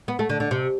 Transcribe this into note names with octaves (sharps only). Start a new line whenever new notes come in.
B3
A3
D3
D3
C3